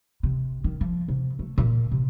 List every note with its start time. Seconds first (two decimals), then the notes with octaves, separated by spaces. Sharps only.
0.23 C3
0.64 D#3
0.81 F3
1.08 C3
1.39 A3
1.58 A#2
1.91 C3